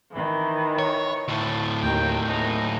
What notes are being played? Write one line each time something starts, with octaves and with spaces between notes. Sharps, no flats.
D#3 E3
C#5
D2 A2 A5
D#2 G5 A#5
A#3 D#4 G#4